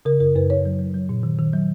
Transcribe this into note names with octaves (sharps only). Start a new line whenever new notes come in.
C#3 A#4
F#2 A#4
F#2 B4
F#2 C#5
F#3
F#3
F#3
A#2
D#3
D#3
F#3